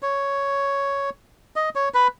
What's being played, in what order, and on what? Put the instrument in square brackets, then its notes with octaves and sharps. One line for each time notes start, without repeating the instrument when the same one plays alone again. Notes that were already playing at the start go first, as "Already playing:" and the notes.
[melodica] C#5
D#5
C#5
B4